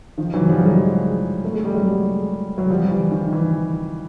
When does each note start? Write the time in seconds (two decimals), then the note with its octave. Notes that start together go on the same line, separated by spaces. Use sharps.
0.18 D#3 F3
0.34 E3 F#3
0.49 F3 G3
0.65 F#3 G#3
1.45 A3
1.54 G#3
1.65 G3
1.74 F#3 G#3
2.58 F#3
2.69 F3 G3
2.91 E3
3.11 D#3
3.33 E3